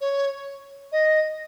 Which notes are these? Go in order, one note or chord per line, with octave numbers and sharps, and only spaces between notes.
C#5
D#5